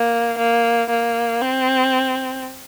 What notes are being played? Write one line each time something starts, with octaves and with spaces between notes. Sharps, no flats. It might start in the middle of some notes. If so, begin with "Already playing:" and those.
Already playing: A#3
A#3
A#3
C4